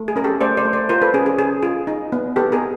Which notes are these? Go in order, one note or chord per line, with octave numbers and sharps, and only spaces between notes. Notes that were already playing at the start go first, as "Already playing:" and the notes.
Already playing: A3
G#4
C#4 A#4
G4 A4
A3 C5 D5
C5 D5
A3
C5 D5
F4 A#4 C5
A4 B4
C#4 G#4
G#4
C#4 G#4
F4 G#4
D#4
B3
B3 G4 A4
G#4 A#4